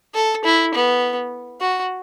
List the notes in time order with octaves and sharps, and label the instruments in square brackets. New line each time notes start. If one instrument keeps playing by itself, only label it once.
[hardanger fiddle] A4
E4
B3
F#4